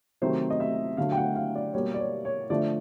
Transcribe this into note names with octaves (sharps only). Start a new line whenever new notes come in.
C3 D#3 F#3 A3 C5
D#5
E5
D3 F#3 A3 F5
G5
F#5
F5
D5
B2 G3 A#3 C#5
D5
C#5
C#5
D3 F3 A3 D5